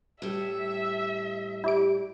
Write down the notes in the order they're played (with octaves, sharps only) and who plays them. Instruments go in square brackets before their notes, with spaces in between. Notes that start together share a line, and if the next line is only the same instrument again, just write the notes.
[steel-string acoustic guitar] A2 G3 [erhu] E5
[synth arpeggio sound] E4 D5 D7 [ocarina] G4